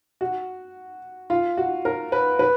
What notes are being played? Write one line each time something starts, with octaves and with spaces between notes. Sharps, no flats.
F#4
F4
F#4
A#4
B4
B4